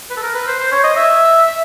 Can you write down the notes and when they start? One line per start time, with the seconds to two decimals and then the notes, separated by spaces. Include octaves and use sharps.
0.10 B4
0.17 A4
0.23 A#4
0.35 B4
0.47 C5
0.59 C5
0.72 C#5
0.84 D#5
0.96 E5